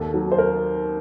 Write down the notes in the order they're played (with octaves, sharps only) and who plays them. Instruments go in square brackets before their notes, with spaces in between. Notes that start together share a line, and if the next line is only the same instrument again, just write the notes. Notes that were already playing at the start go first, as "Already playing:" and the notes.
Already playing: [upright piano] D#2 A4
F#3
C5
A#4